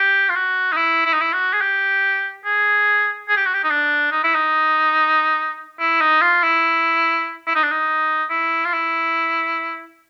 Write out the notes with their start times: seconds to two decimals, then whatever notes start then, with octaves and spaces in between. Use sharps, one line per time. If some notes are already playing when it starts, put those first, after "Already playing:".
Already playing: G4
0.30 F4
0.35 F#4
0.72 D#4
0.77 E4
1.06 E4
1.13 D#4
1.22 E4
1.33 F#4
1.53 G#4
1.61 G4
2.45 G#4
3.28 G#4
3.37 G4
3.46 F#4
3.54 G4
3.64 D#4
3.70 D4
4.12 D#4
4.24 E4
4.35 D#4
5.80 E4
6.01 D#4
6.22 F4
6.43 E4
7.47 E4
7.55 D#4
7.63 D4
7.71 D#4
8.30 E4
8.65 F4
8.73 E4